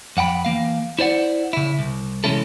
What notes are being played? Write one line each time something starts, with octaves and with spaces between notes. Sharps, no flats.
F2 F#5 G5 B5
E3 A#3 F5
E4 C5 D5 F#5
C#3 E4
C2
C3 E3 G#3 C#4 E4 A4